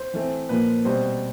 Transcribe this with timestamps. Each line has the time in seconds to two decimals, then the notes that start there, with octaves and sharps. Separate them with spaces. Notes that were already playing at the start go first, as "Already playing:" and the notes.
Already playing: C5
0.14 E3 A3 C4
0.49 A#2 F3 A#3 B4
0.85 B2 G3 C4 C5